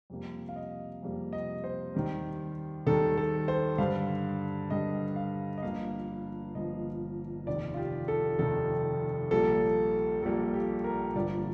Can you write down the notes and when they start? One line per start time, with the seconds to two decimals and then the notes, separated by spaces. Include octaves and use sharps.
0.10 F2 C3 G3 A#3
0.49 F5
0.56 D#5
1.02 F2 C3 G3 A#3
1.33 D#5
1.64 C5
1.94 D#2 D#3 G3
2.87 D#2 D#3 G3 A4
3.17 A4
3.48 C5
3.78 G2 D3 G3 F5
4.70 G2 D3 G3 D#5
5.16 F5
5.58 D#5
5.63 G1 G2 F3 A#3 F5
6.55 G1 G2 F3 A#3 D#5
7.46 F1 D#2 D#3 D5
7.74 F4
7.77 G4
8.08 A4
8.39 F1 D#2 D#3 A4
9.31 A#1 A#2 G3 A#3 A4
10.23 A#1 A#2 G3 A#3 A4
10.54 G4
10.84 A#4
11.15 G1 G2 F3 A#3 D5